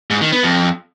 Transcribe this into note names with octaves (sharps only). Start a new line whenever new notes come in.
G#2
D#3
B3
F2